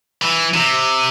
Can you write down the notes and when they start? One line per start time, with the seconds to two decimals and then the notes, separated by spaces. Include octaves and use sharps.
0.22 E3
0.54 C3